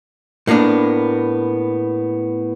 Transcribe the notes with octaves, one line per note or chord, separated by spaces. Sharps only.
A2 A#3 B3 D4